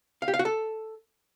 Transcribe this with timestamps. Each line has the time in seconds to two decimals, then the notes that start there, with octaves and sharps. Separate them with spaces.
0.22 F5
0.28 G4
0.34 F5
0.39 F#4
0.45 A4